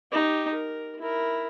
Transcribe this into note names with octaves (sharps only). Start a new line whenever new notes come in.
D#4 G4
A#4
E4 A#4